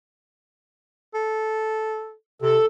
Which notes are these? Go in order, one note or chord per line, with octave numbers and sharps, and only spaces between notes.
A4
C3 A4